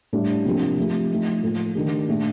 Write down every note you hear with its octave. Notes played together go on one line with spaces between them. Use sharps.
A2 G3 D4
C3 F3 A#3 D4 G4
F3 A3 C4 G4
F3 A3 D#4
A2 F3 A#3 F4 A4
D#3 A3 D4 G4
A#2 A3 D4